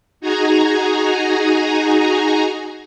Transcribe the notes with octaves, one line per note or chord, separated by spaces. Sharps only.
D#4 F#4 G#4 G#5 A#5